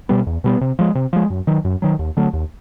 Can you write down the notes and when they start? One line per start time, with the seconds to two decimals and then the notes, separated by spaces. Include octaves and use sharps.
0.09 B2 G3 B3
0.27 E2
0.44 B2 G3 B3
0.61 C3
0.79 F3 G#3
0.95 C3
1.13 F3 G#3
1.30 F#2
1.47 D#3 F#3
1.65 F#2
1.82 D#3 F#3
1.99 D#2
2.17 D3 F#3 A3
2.33 D#2